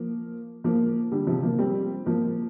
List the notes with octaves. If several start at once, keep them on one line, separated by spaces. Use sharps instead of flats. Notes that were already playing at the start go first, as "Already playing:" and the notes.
Already playing: F3 A#3
F3 A#3
D3 G3
C3 F3
F3 A#3
G3 C4
F3 A#3